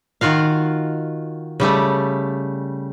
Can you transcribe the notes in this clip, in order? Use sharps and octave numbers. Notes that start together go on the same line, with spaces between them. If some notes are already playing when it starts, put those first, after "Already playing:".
D#3 F4 F#4 F5
C#3 G3 A3